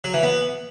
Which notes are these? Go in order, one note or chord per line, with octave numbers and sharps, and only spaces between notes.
F#3
E3
B3